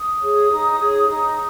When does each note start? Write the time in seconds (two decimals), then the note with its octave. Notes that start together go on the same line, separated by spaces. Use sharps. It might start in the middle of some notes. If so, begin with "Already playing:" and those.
Already playing: D#6
0.20 G#4 C#5
0.50 D#4
0.78 G#4 C#5
1.08 D#4